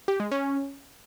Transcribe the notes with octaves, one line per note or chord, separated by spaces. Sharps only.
G4
G#3
C#4